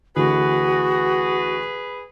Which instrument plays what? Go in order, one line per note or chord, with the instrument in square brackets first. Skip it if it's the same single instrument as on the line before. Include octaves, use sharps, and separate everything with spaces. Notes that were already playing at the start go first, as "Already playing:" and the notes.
[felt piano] D2 D3 E3 [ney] F#4 [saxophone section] G#4 B4